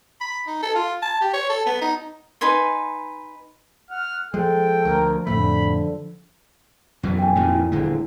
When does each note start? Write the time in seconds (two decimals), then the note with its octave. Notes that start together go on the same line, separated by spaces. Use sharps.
0.21 B5
0.47 D#4
0.62 A4
0.75 F4
1.02 A5
1.21 G4
1.33 C#5
1.49 A4
1.66 B3
1.81 D#4
2.41 D#4 B4 G#5 C6
3.91 F#5 F6
4.34 F3 G#3 A4 G5
4.85 D2 A#4
5.27 F2 A2 D3 A3 B5
7.03 F#2 B2 E3
7.19 G5 G#5
7.35 F2 A#2 D#3
7.48 E4
7.72 D#1 D3 G#3